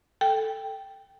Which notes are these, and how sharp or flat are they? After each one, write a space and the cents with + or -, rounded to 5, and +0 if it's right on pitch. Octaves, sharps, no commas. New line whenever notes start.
A4 +0 G5 +0